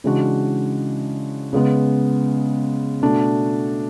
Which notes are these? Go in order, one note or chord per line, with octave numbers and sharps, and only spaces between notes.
C#3 E3 G#3 D4 F#4
C#3 G#3 B3
B2 A3 D4 F#4